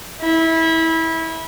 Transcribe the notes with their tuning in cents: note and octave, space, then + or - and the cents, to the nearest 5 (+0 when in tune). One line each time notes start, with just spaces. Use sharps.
E4 -20